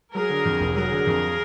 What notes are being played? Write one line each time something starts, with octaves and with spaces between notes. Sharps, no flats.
F#3 G#4 A#4
D3
F2
F1
F#3 G#4 A#4
D3
F2